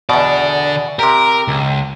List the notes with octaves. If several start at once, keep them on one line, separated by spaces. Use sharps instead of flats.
E2 B2 D3 D5
C3 G4 A#4
C#2